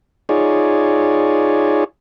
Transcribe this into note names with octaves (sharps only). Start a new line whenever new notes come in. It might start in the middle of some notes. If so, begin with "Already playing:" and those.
D#4 F4 G#4 C#5 D5